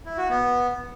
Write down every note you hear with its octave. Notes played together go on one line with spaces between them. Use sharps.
E4
F#4
B3